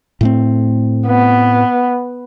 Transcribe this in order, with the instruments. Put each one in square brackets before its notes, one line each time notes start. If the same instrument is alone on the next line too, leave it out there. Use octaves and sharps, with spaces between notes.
[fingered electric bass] A2 A3 C4
[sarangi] B3